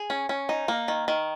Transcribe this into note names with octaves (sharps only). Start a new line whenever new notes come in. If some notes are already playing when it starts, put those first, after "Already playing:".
Already playing: G#4
C#4
C#4
D#4
A#3
D#3
D#3